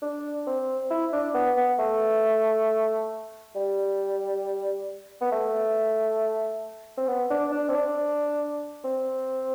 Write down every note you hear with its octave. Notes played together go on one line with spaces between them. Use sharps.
D4
C4
E4
D4
B3
B3
A3
G3
B3
A3
C4
B3
D4
D4
C4
D4
C4